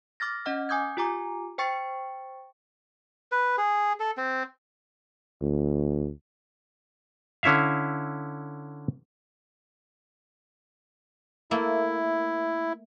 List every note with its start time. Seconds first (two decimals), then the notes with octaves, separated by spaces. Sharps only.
0.20 D6 F6 A6 A#6
0.46 C#4 D#5 F#5 F6
0.69 G#5 D6 D#6 G6 G#6
0.97 F4 G4 G#5 A#5 D6
1.58 C5 G5 C#6 A6 C#7
3.32 B4
3.58 G#4
4.00 A4
4.17 C4
5.42 D2
7.43 D3 C#4 E4 E5 F5
11.51 A3 A#3 E4